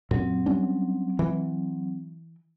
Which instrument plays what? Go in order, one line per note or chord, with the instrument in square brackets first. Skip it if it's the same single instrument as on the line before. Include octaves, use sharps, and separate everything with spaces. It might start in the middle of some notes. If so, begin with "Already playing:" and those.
[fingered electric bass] F#2 A#2 [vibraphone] F#3 C4
[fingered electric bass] G3 C#4 D4
E3